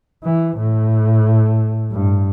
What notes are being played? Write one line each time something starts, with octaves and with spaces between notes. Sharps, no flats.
E3
A2
G2